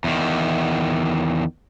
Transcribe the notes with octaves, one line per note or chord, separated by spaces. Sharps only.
E2 D#3